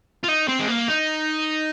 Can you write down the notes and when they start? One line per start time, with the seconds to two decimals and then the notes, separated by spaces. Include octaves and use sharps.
0.24 F4
0.29 D#4
0.48 C4
0.60 G#3
0.68 A#3
0.89 D#4